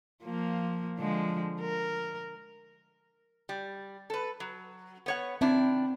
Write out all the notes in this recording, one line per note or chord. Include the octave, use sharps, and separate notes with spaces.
F3 A#3
D3 F3 G#3
A#4
G3
A4 B4
F#3
B3 C#5 F#5
D#3 C4 D4 E4